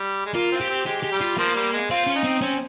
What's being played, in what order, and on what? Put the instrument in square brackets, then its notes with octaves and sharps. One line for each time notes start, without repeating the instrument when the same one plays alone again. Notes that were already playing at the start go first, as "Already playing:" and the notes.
Already playing: [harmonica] G3
G#3
[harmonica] A#3 [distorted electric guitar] F4
[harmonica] C4
[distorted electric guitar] G4
[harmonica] C4
[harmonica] G#3 [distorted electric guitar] G4
[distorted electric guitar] G4
[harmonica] G3
[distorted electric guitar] F4
[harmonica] F3 [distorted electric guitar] A#3
[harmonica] G3
G#3
[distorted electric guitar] C4 [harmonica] F4
[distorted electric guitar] C#4
[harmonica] D#4
[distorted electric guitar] C4
[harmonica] C4 [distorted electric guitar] C#4